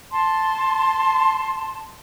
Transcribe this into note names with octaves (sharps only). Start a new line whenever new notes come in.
A5 C6